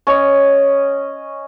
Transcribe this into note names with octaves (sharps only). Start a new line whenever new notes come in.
C#4 D#5